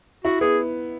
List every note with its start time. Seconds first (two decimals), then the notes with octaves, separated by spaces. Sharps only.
0.25 E4 F#4
0.41 B3 G#4